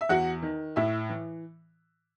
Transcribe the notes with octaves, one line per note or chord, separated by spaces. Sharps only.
E5
E2 F#4 F#5
D#3
A2 E4 E5
E3